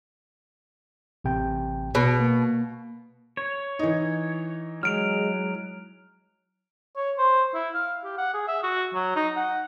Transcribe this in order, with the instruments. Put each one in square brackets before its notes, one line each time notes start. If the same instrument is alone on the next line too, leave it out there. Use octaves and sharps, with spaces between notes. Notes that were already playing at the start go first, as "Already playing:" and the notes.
[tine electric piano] A1 C3 G5
[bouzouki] B2
[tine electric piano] A#3
[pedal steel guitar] C#5
[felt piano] E3 D#4
[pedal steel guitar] F#3 [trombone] G#3 [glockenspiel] F6 D7 F7
[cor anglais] C#5
C5
E4
F5
G4
F#5
G#4
E5
F#4
F#3
D#4
F#5